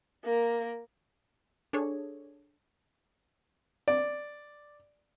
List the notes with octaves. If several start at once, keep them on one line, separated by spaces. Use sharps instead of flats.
A#3 A#4
D4 G#4 A4 C#5
D5